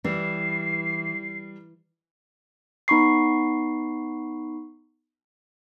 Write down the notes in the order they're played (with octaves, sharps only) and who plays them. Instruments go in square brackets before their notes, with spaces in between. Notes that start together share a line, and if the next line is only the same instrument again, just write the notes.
[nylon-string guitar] E3 [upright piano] G3 [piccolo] C7
[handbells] B3 D#4 B5 C#6 C7